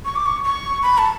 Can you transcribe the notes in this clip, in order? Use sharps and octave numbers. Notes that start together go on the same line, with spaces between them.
C#6
D6
C#6
C#6
B5
A5